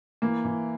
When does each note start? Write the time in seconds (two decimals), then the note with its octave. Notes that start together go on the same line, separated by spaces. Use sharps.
0.22 E3 A#3
0.45 E3